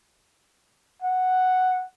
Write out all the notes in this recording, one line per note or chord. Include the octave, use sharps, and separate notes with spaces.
F#5